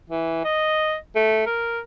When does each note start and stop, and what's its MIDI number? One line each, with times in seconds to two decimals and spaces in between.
0.10 0.44 52
0.44 0.95 75
1.16 1.44 57
1.46 1.80 70